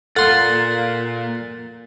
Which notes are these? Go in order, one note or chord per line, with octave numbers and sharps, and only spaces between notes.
A#2 F4 A4 F#5 C6 A6